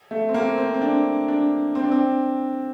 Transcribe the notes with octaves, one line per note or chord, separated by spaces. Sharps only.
A3
C4
A#3
C4
C4
D4
D4
C4
D4
C4